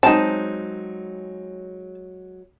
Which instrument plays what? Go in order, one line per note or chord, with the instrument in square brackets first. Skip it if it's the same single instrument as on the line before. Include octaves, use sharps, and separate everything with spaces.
[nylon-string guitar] F#3 G#3 G#4 [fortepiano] C4 D#4 [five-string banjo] A5